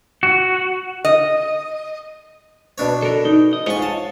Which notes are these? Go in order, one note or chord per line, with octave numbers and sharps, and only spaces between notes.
F#4
D#5
B2 D4 C#5
A4 A#4
D#4
D#5
G#2 F4 C#5 D#5 C#6
A5